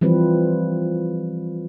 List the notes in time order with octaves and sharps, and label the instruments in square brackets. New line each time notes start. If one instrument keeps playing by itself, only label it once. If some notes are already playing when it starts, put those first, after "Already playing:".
[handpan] E3 F3 G3 C4 B4